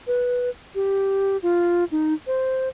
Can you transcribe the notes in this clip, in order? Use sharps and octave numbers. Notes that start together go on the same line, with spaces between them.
B4
G4
F4
D#4
C5